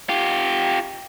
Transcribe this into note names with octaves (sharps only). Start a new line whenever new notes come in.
F4 G4